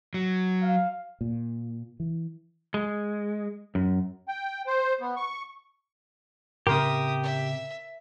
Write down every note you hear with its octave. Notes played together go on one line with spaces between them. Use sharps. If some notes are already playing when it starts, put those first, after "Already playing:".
F#3
F5
A#2
E3
G#3
F#2
G5
C5
B3
C#6
A2 C#3 C4 G4 A#4 E5 C6 D#6
E5